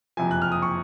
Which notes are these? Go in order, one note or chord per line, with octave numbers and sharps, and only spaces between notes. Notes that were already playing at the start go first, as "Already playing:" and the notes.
F#1 F2 C3 F3 G#5
F#6
F6
D#6
C#6